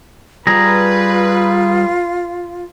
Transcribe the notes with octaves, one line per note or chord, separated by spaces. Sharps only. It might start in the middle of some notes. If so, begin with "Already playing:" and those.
G3 F4 G#4 B4 A#5